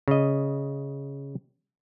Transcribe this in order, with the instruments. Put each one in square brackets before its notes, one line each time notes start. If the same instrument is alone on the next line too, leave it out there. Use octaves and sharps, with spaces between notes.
[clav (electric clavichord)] C#3 D#5